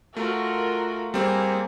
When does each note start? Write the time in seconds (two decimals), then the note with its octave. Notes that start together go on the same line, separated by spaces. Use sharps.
0.16 A3 F4 F#4 A#4
1.14 G3 A#3 C4 G#4